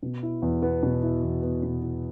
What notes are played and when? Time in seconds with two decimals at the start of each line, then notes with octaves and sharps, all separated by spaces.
0.03 B2
0.23 E4
0.42 E2
0.62 B3
0.83 B2
1.03 E4
1.23 E2
1.42 B3
1.63 B2
1.82 E4